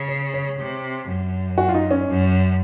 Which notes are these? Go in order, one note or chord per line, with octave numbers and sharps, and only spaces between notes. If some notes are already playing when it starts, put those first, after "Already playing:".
Already playing: C#3
C#5
C#5
C3
F#2
F#4
F4
D#4
C#4
F#2